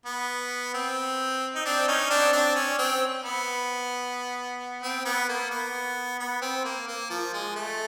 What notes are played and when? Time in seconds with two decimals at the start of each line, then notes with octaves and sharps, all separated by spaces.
0.06 B3
0.74 C4
1.55 D#4
1.65 C4 D4
1.88 C#4 D#4
2.10 C4 D4
2.33 C4 D4
2.56 C#4
2.78 C4
3.24 B3
4.83 C4
5.05 B3
5.29 A#3
5.51 B3
6.19 B3
6.42 C4
6.65 A#3
6.88 A#3
7.10 F3
7.33 G#3
7.56 A3